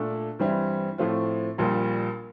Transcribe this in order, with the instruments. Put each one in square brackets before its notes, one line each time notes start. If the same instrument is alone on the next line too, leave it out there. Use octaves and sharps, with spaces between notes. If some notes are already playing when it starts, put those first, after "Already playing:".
Already playing: [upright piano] A#2 A3 D4 A4
G2 E3 G3 C4 E4
A2 F3 A3 C4 F4
A#1 A#2 G3 A#3